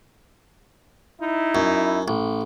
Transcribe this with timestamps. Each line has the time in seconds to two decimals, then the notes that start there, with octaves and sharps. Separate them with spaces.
1.20 D#4 E4
1.55 F#2
2.08 A1